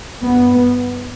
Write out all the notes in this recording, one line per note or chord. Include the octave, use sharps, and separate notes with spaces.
G2 B3